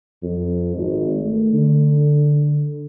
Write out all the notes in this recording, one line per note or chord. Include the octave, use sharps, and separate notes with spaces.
F2
G#1
A3
D3